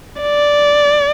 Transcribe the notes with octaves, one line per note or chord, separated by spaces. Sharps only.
D5